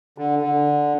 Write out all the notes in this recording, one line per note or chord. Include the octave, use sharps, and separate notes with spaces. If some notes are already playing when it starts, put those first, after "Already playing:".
D3
D3